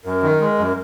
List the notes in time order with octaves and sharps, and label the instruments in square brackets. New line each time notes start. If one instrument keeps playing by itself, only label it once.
[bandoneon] F#2 [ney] A#4
[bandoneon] D#3
G#3
F#2